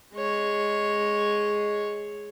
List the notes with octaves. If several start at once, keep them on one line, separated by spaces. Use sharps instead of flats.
G#3 C#5